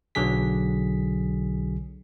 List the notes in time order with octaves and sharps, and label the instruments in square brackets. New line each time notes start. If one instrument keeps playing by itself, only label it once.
[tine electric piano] B1 D3 F#3 G#4 B6